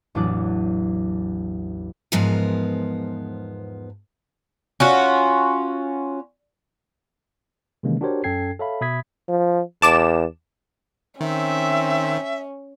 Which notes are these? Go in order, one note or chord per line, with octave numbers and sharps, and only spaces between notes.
A1 E2 F#3 D4 D6 F#6
E2 G#2 F3 B3 A#4 G#5
C#4 F4 F#4
C3 D#3 E3 G#3 A#3 C#4
D4 F#4 G4 A#4 C5 C#5
F#2 C#4 A4 G5 G#6 C7
A4 C#5 E5 F5 B5
B2 E5 B5 D#6 G#6 B6
F3
E2 A5 D6 E7
D#3 C4 C#4 E5